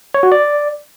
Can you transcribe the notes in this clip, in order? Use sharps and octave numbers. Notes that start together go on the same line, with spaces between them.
C#5
F#4
D5